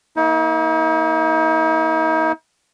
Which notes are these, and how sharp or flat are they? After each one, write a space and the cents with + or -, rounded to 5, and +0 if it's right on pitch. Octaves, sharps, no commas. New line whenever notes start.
A#3 +0 D#4 +45